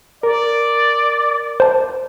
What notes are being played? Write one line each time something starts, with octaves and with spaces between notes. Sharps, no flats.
A#4 D5
C5 A5